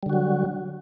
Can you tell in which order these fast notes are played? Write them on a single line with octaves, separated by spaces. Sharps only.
G3 D3 F#4 F#3